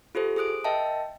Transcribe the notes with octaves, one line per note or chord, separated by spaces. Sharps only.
F4 G4 A4 C5
G#4 C5 D#6 F#6 D7
A#4 D#5 E5 G5 A5